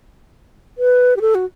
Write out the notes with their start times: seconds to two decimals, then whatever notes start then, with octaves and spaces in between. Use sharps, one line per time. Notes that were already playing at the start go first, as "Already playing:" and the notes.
0.78 B4
1.16 G4
1.21 A4
1.35 F#4